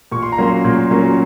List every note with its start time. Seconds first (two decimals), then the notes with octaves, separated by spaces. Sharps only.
0.12 A#2 C#6
0.22 C6
0.32 A#5
0.38 F#3 A#3 C#4 C6
0.65 A#2
0.91 F#3 A#3 C#4